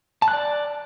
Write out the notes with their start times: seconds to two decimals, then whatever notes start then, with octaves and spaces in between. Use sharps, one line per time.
0.22 A5
0.28 F#6
0.33 D5